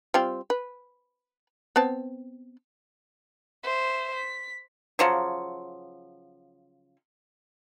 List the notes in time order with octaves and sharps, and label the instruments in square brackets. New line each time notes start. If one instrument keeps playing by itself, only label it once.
[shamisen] G3 C4 F4
B4
B3 C4 A5
[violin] C5 E5
B6
[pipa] C#3 F3 F#3